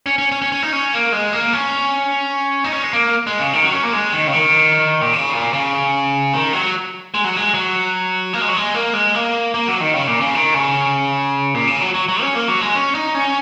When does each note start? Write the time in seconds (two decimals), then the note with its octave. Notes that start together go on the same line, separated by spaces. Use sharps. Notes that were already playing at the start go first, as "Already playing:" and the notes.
0.06 C#4
0.18 C#4
0.32 C#4
0.42 C#4
0.52 C#4
0.63 D#4
0.73 C#4
0.93 A#3
1.12 G#3
1.33 A#3
1.53 C#4
2.64 D#4
2.73 C#4
2.84 G#3
2.93 A#3
3.27 G#3
3.39 C#3
3.53 D#3
3.63 F#3
3.72 C#4
3.83 A#3
3.93 G#3
4.12 D#3
4.27 C#3
4.33 D#3
5.01 A#2
5.13 C#3
5.33 A#2
5.53 C#3
6.34 D#3
6.53 F#3
7.14 G#3
7.24 F#3
7.37 G#3
7.54 F#3
8.33 A#3
8.41 G#3
8.49 F#3
8.56 G#3
8.74 A#3
8.94 G#3
9.15 A#3
9.54 A#3
9.68 F#3
9.81 D#3
9.94 C#3
10.07 A#2
10.20 C#3
10.35 D#3
10.54 C#3
11.54 A#2
11.67 C#3
11.81 F#3
11.94 F#3
12.08 F#3
12.22 C#4
12.35 A#3
12.48 F#3
12.61 G#3
12.75 C#4
12.95 D#4
13.15 C#4